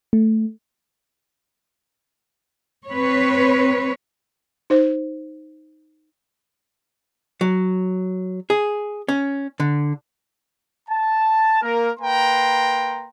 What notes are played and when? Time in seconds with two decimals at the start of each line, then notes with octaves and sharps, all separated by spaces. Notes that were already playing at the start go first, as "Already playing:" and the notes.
0.13 A3
2.87 C4 B4 C#5
4.70 D#4 C5
7.41 F#3
8.50 G#4
9.08 C#4
9.60 D3
10.89 A5
11.62 A#3 A#4
11.99 A#3 B4 G5 A#5 C6